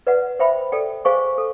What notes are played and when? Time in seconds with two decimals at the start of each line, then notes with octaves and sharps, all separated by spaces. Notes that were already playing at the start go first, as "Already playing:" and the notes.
0.07 B4 D5 F#5
0.39 C5 E5 G5 B5
0.72 A4 D5 G5
1.05 G#4 C5 F5 G#5 C#6
1.38 A4